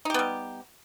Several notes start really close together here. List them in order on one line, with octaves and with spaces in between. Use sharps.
D#4 G4 B3 G3